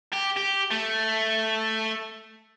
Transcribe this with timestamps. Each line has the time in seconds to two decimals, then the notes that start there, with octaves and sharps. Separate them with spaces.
0.14 G4
0.37 G4
0.71 A3